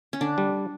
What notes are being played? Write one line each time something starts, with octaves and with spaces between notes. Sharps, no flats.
C#4
D3 D4
G3